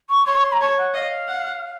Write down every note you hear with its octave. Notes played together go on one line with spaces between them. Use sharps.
C#6
C#5 C6
C#6
C6
A#5
C#5 A5
F#5
D#5 F5
F#5